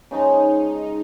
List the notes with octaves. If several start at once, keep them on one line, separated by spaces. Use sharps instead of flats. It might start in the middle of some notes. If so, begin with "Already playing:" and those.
C#3 F3 G#3 D#4